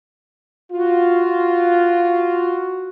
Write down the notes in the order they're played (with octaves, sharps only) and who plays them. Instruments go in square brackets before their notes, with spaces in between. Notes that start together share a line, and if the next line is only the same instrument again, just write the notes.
[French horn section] F4 [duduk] F#4